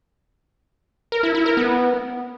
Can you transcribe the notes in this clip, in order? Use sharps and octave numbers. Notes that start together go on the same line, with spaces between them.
A#4
E4
E4
A#4
B3